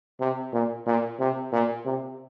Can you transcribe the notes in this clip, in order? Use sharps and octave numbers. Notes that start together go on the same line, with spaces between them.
C3
A#2
A#2
C3
A#2
C3